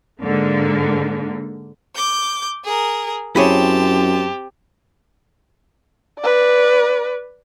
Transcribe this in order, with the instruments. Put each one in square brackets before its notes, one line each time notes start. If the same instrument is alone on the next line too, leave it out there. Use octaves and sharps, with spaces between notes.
[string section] G#2 D3 A#3
[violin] D6 G6
G#4 A#4
[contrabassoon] F#2 [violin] C4 A5 [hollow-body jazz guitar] E4 G#4 C#5 [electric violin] G4
[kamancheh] B4 D5